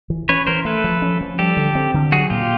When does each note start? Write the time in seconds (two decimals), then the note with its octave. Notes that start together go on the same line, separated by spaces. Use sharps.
0.10 E3
0.29 C#4 B4 C#5
0.47 E3 A#4 C5
0.65 A3 A4 B4
0.84 F3
1.02 C#4
1.21 F3
1.39 G3 G4 A4
1.57 D3
1.75 C4
1.94 D3
2.12 F#3 F#4 G#4
2.30 A#2 F4 G4